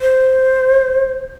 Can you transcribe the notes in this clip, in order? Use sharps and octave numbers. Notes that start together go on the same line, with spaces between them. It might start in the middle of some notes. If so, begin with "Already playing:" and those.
C5